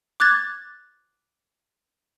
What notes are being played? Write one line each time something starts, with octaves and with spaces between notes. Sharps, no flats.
D6 F#6 G#6 A6